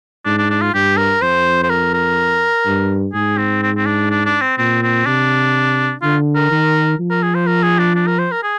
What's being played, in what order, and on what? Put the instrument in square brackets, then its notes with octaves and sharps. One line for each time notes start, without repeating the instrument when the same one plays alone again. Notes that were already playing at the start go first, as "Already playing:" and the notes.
[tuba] G#2 [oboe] D4
[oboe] D4
D4
F4
[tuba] G2 [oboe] G4
[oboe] A#4
[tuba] F2 [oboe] C5
[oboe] C5
A#4
A#4
[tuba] G2
[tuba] G#2 [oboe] G#4
[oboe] C4
C4
C4
D4
D4
D4
C4
[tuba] A#2 [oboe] C4
[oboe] C4
[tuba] C3 [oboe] D4
[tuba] D3 [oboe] F4
[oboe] A#4
[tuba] D#3
F3
[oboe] A#4
G#4
C5
A#4
G#4
D4
D4
A#4
C5
A#4
G#4